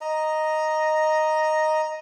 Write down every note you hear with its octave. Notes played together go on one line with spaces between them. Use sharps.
D#5 A#5